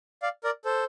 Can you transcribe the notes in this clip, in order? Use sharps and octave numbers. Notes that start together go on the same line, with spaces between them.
D5 F5
A#4 D5
A4 C5